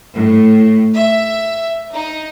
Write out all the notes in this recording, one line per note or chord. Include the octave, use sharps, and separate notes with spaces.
A2
E5
D#4